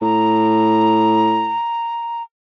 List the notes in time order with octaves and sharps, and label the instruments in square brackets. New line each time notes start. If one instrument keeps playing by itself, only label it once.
[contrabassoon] A2 [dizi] A#5